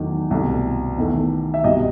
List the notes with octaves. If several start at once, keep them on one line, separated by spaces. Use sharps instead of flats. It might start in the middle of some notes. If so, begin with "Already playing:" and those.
Already playing: E2 D#3 F#3 A3
C2 B2 A3
E2 D#3 A3
E5
C2 B2 G3 D#5